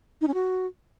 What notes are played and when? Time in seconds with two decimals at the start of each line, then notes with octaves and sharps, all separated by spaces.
0.21 D#4
0.28 C#4
0.34 F#4